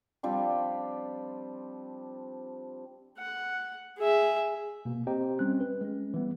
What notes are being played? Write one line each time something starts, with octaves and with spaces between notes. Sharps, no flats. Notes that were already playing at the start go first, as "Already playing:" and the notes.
F3 G3 C4 D4
F#5
G#4 E5
B2 A#3
C4 G4 C5 D#5 G5 A#5
G3 C4 C#4 F#6
B4
G#3 C#4
E3 G3 B3